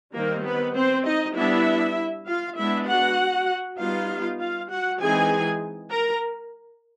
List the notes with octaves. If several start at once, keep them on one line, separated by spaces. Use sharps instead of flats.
D#3 G3 A#3 C4 D#4 A#4
B3 B4
C4 C5
D#4 D#5
G3 B3 D4 E4 E5
F4 F5
G#3 B3 D4 E4 E5
F#4 F#5
G3 B3 D#4 F4 F5
F4 F5
F#4 F#5
E3 G#3 C4 D#4 G#4 G#5
A#4 A#5